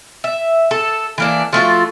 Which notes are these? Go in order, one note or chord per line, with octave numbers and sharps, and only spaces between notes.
E5
A4
E3 A#3 D4
F3 A3 F4 F#4